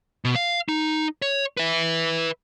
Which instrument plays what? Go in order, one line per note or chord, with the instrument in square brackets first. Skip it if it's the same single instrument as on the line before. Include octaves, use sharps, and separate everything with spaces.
[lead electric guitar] B2
F5
D#4
C#5
B4 E5